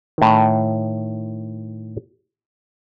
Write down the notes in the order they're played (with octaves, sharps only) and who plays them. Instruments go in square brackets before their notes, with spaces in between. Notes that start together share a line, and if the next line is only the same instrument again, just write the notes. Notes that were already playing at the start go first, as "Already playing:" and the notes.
[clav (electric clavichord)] A2 D#3